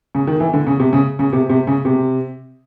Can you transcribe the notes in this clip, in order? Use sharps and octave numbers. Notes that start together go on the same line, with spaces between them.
C#3
D#3
E3
D3
C#3
C3
C#3
C#3
C3
C3
C#3
C3